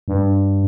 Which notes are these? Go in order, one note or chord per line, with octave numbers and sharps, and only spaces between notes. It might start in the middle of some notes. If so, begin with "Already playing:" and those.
G2